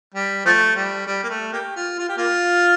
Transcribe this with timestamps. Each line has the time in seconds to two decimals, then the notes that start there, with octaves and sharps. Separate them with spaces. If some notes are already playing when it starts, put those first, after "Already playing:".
0.14 G3
0.46 F3 A3
0.76 G3
1.07 G3
1.23 A#3
1.29 A3
1.52 A#3 G4
1.76 F4
1.99 F4
2.09 G4
2.17 A#3 F4